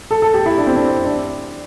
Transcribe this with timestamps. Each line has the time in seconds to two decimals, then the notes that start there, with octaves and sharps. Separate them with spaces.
0.11 A4
0.22 A4
0.34 G4
0.46 E4
0.58 D4
0.67 C4
0.76 D4
1.05 D4